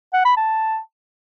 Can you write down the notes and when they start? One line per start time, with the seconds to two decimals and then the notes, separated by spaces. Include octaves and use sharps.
0.13 F#5
0.25 B5
0.37 A5